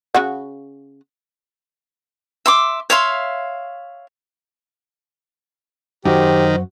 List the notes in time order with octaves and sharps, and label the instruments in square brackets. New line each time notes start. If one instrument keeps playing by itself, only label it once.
[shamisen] C#3 F#4 F#5
[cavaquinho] E5 C6 D6
C#5 E5 F5 C6
[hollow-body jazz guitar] F#2 F#4 [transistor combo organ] D#3 [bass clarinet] G4 [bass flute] C5